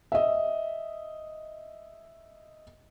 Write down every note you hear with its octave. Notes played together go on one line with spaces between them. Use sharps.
D#5 E5